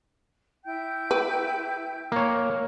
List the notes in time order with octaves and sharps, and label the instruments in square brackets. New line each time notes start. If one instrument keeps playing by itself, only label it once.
[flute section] E4 G5 G6
[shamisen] B4
[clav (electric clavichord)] A#3 C#5